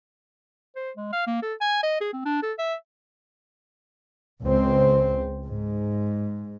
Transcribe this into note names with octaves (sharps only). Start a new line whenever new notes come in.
C5
G#3
F5
A#3
A4
G#5
D#5
G#4
C4
D4
A4
E5
C#2 C4
G#2